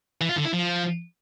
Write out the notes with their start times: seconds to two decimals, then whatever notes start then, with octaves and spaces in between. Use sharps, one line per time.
0.21 E3
0.29 F4
0.37 D3
0.45 E4
0.53 F3